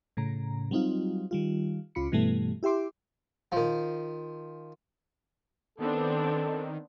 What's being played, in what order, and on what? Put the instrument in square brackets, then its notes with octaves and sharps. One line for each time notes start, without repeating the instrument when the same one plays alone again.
[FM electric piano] A2 C#3 A#5
F#3 G3 C4 D#4 F4
D#3 G3 F4
C#2 C#3 F4 B5 C#7
G2 B2 E3 G3 A3
E4 G4 E5 C6 D6
[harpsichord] D#3 F3
[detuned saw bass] D#3 [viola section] B3 C4 D4 [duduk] A4